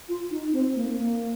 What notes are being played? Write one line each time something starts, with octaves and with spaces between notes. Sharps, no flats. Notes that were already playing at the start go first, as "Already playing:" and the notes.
F4
D#4
C4
A#3
A#3